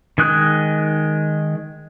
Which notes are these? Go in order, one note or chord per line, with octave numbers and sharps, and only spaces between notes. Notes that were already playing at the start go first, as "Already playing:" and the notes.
D#3 G#3 D#6 F#6